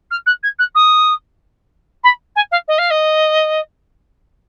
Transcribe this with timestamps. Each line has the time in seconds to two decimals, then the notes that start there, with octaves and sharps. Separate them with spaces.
0.10 F6
0.26 F#6
0.43 G#6
0.58 F#6
0.74 D#6
2.03 B5
2.35 G#5
2.51 F5
2.67 D#5
2.78 F5
2.90 D#5